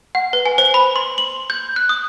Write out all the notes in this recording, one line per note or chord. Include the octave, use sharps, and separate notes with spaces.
F#5
B4
G#5
C5
B5
C6
F#7
G6
F#6
D#6